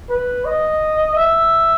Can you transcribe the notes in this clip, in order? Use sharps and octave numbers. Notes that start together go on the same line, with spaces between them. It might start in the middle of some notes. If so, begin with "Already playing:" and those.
B4
D#5
E5